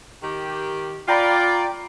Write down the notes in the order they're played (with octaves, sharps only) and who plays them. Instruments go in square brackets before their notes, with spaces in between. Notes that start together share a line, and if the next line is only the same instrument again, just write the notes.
[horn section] D#3 G4
[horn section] F4 D5 [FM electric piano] G5 A#5 B5